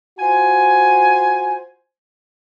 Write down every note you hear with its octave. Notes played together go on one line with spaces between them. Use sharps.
F4 F#4 C5 G#5